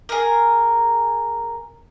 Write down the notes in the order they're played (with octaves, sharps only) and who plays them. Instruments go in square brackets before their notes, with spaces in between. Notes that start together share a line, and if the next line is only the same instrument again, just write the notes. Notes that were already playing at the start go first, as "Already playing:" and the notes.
[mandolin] G#4 A#4